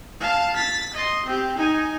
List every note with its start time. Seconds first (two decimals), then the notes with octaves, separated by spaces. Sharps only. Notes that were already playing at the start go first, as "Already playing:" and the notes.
0.20 F5 A5
0.56 A6 B6
0.94 D#5 C6
1.25 C4 G4
1.58 D#4 G#5